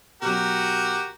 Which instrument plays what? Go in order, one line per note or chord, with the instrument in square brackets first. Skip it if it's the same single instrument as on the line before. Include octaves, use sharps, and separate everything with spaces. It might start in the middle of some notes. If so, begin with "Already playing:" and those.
[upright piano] B2 F#3 [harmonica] F#4 G4 A#4